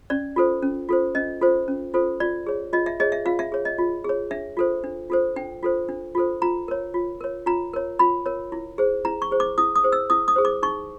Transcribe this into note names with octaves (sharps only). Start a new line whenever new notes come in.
C#4 D5
F4 A4 C5
C#4
F4 A4 C5
C#4 D#5
F4 A4 C5
C#4
F4 A4 C5
F4 D5
G#4 C#5
F4 D#5
E5
G#4 C#5 D#5
E5
F4 F5
E5
G#4 C#5
D#5
F4
G#4 C#5
D4 E5
F4 A4 C5
D4
F4 A4 C5
D4 G5
F4 A4 C5
D4
F4 A4 C5
F4 A#5
A#4 C#5
F4
A#4 C#5
F4 A#5
A#4 C#5
F4 B5
A#4 C#5
E4
G#4 C5
E4 A#5
C#6
G#4 C5
D6
E4 D#6
D#6
G#4 C5
E6
E4 D#6
D#6
G#4 C5
D6
D#4 C#6